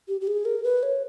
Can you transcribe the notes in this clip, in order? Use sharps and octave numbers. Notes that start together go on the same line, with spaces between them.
G4
G4
G#4
A#4
B4
C#5